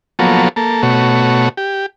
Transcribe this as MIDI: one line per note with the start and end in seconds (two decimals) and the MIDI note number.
0.19 0.49 53
0.19 0.49 54
0.19 0.49 58
0.19 0.49 59
0.19 0.49 69
0.19 0.49 73
0.56 0.82 58
0.56 0.82 69
0.83 1.49 47
0.83 1.49 57
0.83 1.49 66
0.83 1.49 73
1.57 1.86 67